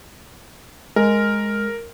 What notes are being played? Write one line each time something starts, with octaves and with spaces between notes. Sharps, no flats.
G#3 A#4